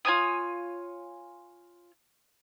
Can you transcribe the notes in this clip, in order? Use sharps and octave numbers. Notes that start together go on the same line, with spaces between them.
F4 C#5 G#5 D#6